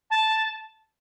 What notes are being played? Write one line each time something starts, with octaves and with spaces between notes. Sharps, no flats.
A5